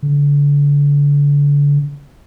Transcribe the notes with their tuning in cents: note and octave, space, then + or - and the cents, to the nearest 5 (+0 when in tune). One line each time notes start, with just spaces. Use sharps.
D3 -35